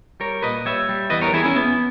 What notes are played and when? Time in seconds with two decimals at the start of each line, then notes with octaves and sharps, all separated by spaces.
0.20 G3 A#4 C#5
0.43 A#2 B4 D#5
0.65 G3 C#5 E5
0.89 G3
1.10 E2 B4 D#5
1.21 A#4 C#5
1.33 E2 E4 G#4
1.44 C#4 E4
1.55 E2 B3